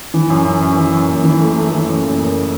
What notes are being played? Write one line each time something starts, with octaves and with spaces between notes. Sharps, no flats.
E3
F#2
F#2
F#2
E3
F#2
F#1
E3
A3
A3
E3
F#2
F#1
F#1